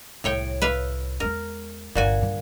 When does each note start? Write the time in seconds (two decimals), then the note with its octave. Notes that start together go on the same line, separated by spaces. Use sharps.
0.24 C2 A2 C#5 G5
0.62 B4 E5 F5
1.20 E2 G#3 A#4
1.95 G1 D#2 A#2 F#4 G#5
2.22 G2 D3